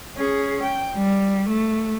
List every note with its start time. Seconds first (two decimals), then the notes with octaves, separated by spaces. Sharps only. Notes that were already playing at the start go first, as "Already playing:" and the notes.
0.17 C#4 G#4
0.63 G5
0.96 G3
1.49 A3